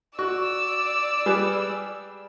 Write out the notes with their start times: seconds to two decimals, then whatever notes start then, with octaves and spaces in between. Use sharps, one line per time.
0.19 F#4 D5 C#6 E6
1.26 G3 G#4 B4